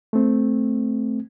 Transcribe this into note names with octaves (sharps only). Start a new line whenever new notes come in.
A3 C4